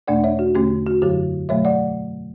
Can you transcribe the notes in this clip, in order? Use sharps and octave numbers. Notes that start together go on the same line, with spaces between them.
E2 B2 A3 D4 D5 F#5
C#5 E5
F#4
E2 D3 A3 C#4 G4
F#4
F#2 D3 F#3 G4
B2 F#3 A3 C#5 E5
D5 F#5